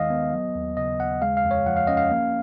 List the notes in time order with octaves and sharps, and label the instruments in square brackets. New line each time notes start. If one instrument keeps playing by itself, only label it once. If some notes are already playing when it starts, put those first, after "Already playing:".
Already playing: [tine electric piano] D#2 D#3 G#3 D#5 F5
B3
F#3
D#2
C#3 D#5
D#2 F#5
G#3 F5
F5
F2
C#5
F3 F#5
F5
C#4 D#5
F5
A#3